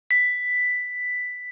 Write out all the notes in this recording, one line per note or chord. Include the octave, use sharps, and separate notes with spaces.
B6